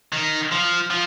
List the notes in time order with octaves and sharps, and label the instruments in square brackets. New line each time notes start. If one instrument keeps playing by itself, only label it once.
[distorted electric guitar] D#3
F3
F3